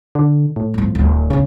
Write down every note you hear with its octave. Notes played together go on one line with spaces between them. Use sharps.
D3
A2
G1 F3
D1
A1 C#3 D4